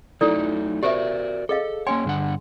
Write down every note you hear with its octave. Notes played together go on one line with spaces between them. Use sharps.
F#3 A3 D#4 E4 A4 D5
F#4 G4 A#4 C5 D5 E5
G#4 A4 D#5 F5
A#3 C#4 C#5 G5 G#5 C6
G2 D3 F#5